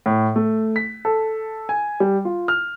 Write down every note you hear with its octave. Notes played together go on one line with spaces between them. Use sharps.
A2
A3
B6
A4
G#5
G3
F4
F6